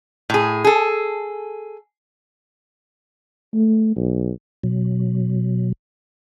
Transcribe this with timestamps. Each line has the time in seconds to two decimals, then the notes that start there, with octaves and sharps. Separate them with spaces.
0.30 A2 G#4
0.64 G#4 A4
3.53 A3
3.96 B1
4.63 B2 F#3